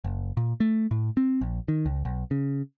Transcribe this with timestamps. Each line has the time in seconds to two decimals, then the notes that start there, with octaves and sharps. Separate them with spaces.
0.04 F#1
0.37 A#2
0.60 A3
0.91 A2
1.17 C4
1.41 A#1
1.68 D#3
1.86 C#2
2.05 B1
2.31 C#3